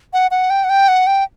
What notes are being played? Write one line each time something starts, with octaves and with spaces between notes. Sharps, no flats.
F#5
F#5
G5
F#5
G5
F#5
G5